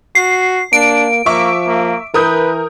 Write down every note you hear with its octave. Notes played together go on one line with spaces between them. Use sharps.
F#4 C7
A#3 D4 D7
F3 A#3 E5 C#6 D6
A#3
E3 A#4 B4 D#6 G6